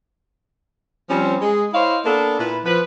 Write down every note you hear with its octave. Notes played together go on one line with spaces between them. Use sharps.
F3 G3 C4 C#4
G#3 G#4
E4 C5 C#5 D#5 F5
A#3 B3 D4 A4
A#2 E4 B4
F3 B4